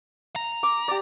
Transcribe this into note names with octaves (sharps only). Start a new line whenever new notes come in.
A#5
D6
G4 D5